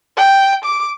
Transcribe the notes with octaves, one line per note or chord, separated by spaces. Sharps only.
G5
D6